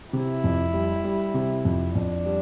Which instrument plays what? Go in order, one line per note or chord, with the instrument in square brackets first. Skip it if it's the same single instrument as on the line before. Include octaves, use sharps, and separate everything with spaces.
[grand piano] C3 [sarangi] E4
[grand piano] F2
G3
G3
C3
F2
[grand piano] F2 [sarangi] D4
[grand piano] G3